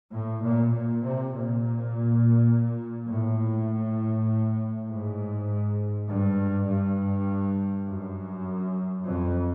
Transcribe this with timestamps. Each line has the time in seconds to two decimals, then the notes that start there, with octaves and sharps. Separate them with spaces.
0.13 A2
0.42 A#2
0.71 A#2
1.02 C3
1.32 A#2
3.10 A2
4.89 G#2
6.09 G2
6.68 G2
7.88 F#2
9.07 F2